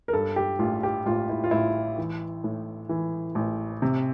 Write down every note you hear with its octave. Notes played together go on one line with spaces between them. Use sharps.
A#4
G2 A4
G4
A1 F4
G4
A1 F4
E4
F4
A1 E4
E3
A2
E3
A1
C3